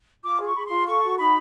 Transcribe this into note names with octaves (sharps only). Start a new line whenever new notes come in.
F4 D6
G#4
C#6
G#4 B5
F4 C6
A4 C#6
F#4
D#4 B5